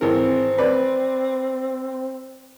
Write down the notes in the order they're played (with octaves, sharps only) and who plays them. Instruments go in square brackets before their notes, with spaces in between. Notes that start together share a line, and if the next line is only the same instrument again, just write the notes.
[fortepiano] G#1 E3 A#4 [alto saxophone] C4
[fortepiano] B4 D5